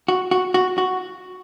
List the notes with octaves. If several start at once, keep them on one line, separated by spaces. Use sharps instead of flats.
F#4
F#4
F#4
F#4